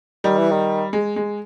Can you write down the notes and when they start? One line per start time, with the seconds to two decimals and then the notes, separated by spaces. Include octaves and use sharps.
0.24 D#3 G3
0.38 E3
0.51 D#3
0.93 G#3
1.16 G#3